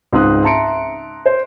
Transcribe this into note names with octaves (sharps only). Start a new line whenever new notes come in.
C#2 G#2 C4 C6 D#6 F#6
E5 A5 A#5 C6 C#7 D7
C5